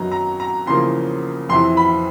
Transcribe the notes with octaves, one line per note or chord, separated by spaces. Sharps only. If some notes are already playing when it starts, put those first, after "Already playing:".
Already playing: F#2 D#3 F#3 B3 D#4 A#5
A#5
A#5
E2 C#3 F3 A#3 C6
F2 C3 E3 C6
B5